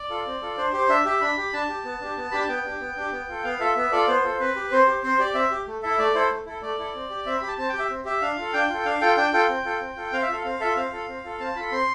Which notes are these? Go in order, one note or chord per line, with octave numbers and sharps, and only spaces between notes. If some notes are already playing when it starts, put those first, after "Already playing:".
Already playing: D5
F4 A4
C4
F4 A4
D4 C5
G4 C5
D4 E5
G4 E5
D4 B5
G4
D4 A5
G4
B3
D4 G4
B3
D4 G4 B5
A5
B3 G5
D4 G4
B3
D4 G4
B3
F4 A4
B3 F5
F4 A4 E5
B3 E5
F4 A4 D5
B3 C5
F4 A4
C4 B4
G4
C4 C5
G4
C4 C5
G4 D5
C4 E5
G4
A3
E4 A4 E5
A3 D5
E4 A4 C5
A3
E4 A4
A3 D5
E4 A4
C4
G4
C4 E5
G4 B5
A5
C4 A5
G4 G5
E5
C4
G4 E5
D4 F5
F4 A4
D4 G5
F4 A4
D4 F5
F4 A4 G5
D4 G5
F4 A4 G5
C4
F4 A4
C4
F4 A4
C4 F5
E5
F4 A4 F5
C4 F5
F4 A4 E5
C4 F5
F4 A4
C4
F4 A4
C4 A5
F4 A4 B5
C4 C6